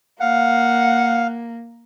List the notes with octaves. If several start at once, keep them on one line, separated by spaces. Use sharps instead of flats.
A#3 F5 F#5